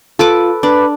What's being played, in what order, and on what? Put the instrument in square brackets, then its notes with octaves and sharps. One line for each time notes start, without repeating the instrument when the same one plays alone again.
[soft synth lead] F4 [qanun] A4 B4 D6
[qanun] D4 [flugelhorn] B4 [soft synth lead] D6